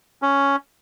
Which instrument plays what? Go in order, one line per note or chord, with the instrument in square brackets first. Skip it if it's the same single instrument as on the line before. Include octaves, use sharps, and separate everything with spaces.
[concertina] C#4